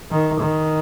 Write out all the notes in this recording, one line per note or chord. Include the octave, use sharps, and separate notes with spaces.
D#3
D#3